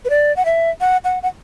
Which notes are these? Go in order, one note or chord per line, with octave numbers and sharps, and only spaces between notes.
B4
D5
F#5
E5
F#5
F#5
F#5